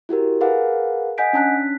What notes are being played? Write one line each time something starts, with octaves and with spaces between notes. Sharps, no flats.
E4 F#4 G4 A#4
G#4 A#4 B4 F5 F#5
D#5 F#5 G#5 G6 B6 D7
C#4 D4 A5 F#6 B6